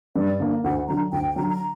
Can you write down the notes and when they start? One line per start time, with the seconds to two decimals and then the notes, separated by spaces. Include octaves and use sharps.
0.16 G2 D5
0.40 D3 A#3
0.64 D2 F#5
0.88 D3 F#3 A#5
1.12 D2 G5
1.29 G5
1.36 D3 F#3 A#5
1.50 A#5